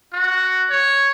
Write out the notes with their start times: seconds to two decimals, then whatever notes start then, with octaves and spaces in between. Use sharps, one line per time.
0.13 F#4
0.70 C#5